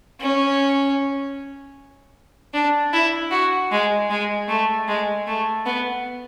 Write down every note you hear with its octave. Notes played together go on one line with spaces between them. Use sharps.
C#4
D4
E4
F#4
G#3
G#3
A3
G#3
A3
B3